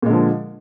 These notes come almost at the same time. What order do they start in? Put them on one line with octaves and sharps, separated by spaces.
A#2 G#3 D3 F3